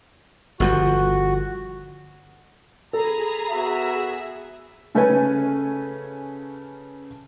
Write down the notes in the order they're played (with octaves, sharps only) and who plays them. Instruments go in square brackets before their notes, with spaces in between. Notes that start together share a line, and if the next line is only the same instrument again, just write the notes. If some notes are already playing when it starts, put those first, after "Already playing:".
[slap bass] G1 F3 G3 [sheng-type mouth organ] F#4
[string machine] G#4 [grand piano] A4 [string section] A#5 B5
[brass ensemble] B3 F#4 E5
[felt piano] C#3 A3 C#4 A4 B4 G#5